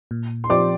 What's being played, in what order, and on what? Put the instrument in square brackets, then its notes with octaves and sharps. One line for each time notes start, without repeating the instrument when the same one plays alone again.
[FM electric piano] A#2
[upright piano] C6
[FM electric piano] F3 C4 G4 C5 [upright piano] D5 D6